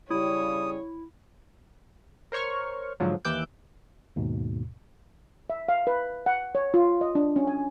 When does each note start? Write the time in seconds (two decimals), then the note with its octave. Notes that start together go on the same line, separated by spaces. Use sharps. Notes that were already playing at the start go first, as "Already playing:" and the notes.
0.11 C#3 G3 E4 C#5 D#6
2.32 A#4 C5 C#5 C#6 F6
3.00 G#2 D3 F3 F#3
3.25 D#2 E3 D6 E6 F#6 G6
4.16 D#2 G#2 B2
5.50 E5
5.69 F5
5.87 B4
6.26 F#5
6.55 C#5
6.74 F4
7.01 D#5
7.15 D4
7.36 C#4
7.47 G#5